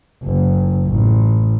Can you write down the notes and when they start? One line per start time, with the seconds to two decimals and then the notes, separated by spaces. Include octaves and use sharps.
0.24 F#1
0.86 A1